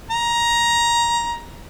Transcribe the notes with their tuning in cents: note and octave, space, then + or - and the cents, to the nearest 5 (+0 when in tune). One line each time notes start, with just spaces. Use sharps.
A#5 +15